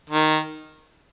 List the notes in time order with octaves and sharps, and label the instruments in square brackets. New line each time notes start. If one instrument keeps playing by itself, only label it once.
[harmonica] D#3